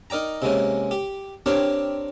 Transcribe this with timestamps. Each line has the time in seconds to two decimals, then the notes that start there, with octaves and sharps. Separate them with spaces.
0.10 D#4 A#4 D5 G5 A#5
0.42 C3 G#3 A#3 C#4
0.91 G4
1.46 C4 D4 G4 A#4 C#5 D5